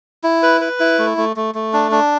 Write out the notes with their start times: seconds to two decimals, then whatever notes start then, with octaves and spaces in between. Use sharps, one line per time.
0.24 E4
0.43 B4
0.61 B4
0.80 E4
0.99 A3
1.17 A3
1.36 A3
1.55 A3
1.73 D4
1.92 D4